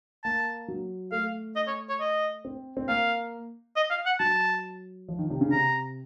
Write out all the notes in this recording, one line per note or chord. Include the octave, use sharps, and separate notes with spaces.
A#3 A5
F#3
A3 F5
D#5
C#5
C#5
D#5
C4
C4
A#3 F5
D#5
F5
F#5
F#3 A5
F3
D#3
C3
C#3
C3 A#5